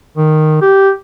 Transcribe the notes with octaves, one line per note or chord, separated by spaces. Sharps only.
D#3
G4